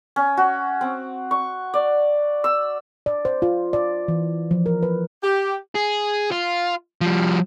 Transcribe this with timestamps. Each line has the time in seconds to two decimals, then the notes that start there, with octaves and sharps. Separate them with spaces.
0.16 C#4
0.37 F#4
0.81 C4
1.31 C#6
1.74 D5
2.44 E6
3.06 D5
3.25 C5
3.42 F4
3.73 D5
4.08 E3
4.51 F3
4.66 A#4
4.83 B4
5.23 G4
5.75 G#4
6.31 F4
7.01 F3 G3